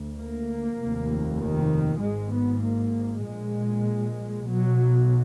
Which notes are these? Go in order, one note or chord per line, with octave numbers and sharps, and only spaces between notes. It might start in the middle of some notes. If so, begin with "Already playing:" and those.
Already playing: D2
A#3
F1 D#2
D#3
G#1 G#2 G#3
B3
A#3
A#1 A#2 G#3
B1 B2 F#3